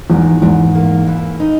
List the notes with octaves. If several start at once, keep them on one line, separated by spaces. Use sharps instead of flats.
E2 G#2
E2 G#2
A#3
E3
D#4